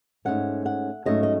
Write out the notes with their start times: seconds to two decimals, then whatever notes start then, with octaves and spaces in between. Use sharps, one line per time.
0.25 G#2 F#3 A3 C#4 F#5
0.66 F#5
1.05 G#2 F#3 A3 C#4 D#5
1.23 D#5